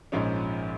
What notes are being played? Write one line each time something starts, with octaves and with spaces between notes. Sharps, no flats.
A#1 G#2 F3 G#3 C#4